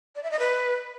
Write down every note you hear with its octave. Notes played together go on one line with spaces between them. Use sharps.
D5
E5
D#5
B4